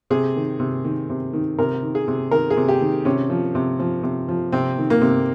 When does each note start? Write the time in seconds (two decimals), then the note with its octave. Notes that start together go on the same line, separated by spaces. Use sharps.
0.10 C3 G#4
0.36 D#3
0.60 C3
0.84 D#3
1.10 C3
1.33 D#3
1.59 C3 A#4
1.82 D#3
1.95 G#4
2.08 C3
2.31 D#3 A#4
2.50 G#4
2.57 C3
2.68 G4
2.81 D#3
3.05 C3 C#4
3.30 F3
3.55 C3
3.80 F3
4.03 C3
4.29 F3
4.52 C3 C4
4.78 D#3
4.90 A#3
5.02 C3